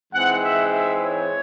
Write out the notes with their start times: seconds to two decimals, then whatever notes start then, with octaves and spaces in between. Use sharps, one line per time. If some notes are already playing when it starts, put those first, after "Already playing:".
0.13 G#2 E3 G#3 C4 F#5
0.42 E5
0.73 E5
1.03 C#5